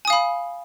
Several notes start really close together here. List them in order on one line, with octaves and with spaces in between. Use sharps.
G#5 D#6 F5 B5